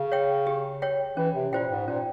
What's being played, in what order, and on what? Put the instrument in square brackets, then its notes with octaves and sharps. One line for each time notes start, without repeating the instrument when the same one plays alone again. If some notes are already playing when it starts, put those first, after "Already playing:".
Already playing: [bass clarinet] C#3
[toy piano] C#5 G5
G4
C#5 G5
[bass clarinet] E3 [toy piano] C#4
[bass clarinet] C3
[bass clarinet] A#2 [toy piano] F4 C5 G5
[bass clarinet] G#2
[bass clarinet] A#2 [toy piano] C#4